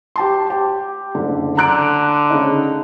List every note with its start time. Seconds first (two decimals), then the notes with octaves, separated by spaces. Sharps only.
0.16 G4 A5 C6
0.50 G4
1.15 F#1 D3
1.57 D3 A#5 F#6 D7
2.30 C#3 D#4